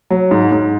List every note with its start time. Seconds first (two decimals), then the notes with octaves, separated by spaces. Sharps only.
0.10 F#3
0.31 G#2
0.52 G#2